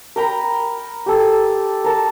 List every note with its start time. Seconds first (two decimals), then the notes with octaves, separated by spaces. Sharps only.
0.16 A#4 G5 A#5 B5
1.06 G4 A4
1.84 A#4 A5